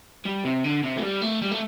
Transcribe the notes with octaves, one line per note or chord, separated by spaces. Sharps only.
G3
C3
D3
C3
A3
G3
A3
G3
A3